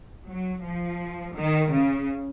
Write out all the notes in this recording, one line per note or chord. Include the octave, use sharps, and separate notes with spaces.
F#3
F3
D#3
C#3